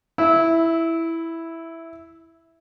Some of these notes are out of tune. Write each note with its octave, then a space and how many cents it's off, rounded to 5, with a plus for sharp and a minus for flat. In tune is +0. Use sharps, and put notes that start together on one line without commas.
E4 +0 E6 -20